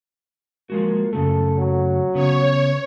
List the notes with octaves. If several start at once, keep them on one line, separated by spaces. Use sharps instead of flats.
F3 G#3 A#3 F#4
F#2 C#3 A3 A4
F#3
C#3 B3 C#5